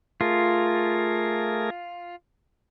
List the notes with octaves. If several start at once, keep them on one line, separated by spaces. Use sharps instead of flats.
A3 F4 G#4 A#4